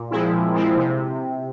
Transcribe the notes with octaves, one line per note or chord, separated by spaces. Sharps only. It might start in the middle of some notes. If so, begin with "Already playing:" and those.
Already playing: A#2
F3 G#3 C4 E4
A#2
F3 G#3 C4 E4
C3